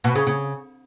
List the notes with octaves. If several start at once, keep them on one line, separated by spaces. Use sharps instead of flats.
B2
C#3
C#3